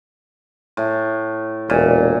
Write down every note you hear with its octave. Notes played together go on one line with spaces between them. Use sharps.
A2
E1 A#2